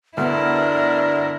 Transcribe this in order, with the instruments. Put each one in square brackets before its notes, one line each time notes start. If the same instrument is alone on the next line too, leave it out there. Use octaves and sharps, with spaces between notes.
[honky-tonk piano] D2 B3 [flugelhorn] D4 [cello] E4 A#4 [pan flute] F6